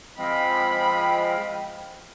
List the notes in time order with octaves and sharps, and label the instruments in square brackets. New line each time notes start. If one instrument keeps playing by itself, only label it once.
[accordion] F3 G#3 C4 [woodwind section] D#5 F5 G5 [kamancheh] B5